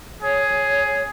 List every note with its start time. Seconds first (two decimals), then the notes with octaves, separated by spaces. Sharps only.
0.23 G#4 C#5